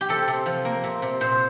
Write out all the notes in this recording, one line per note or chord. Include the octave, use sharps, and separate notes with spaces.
G4
C3 A4
C3
F3
A#3
C3
C3
A#2 C5